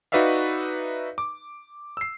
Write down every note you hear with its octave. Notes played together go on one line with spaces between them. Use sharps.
D#4 F#4 B4 D5 E5 F5
D6
E6 C7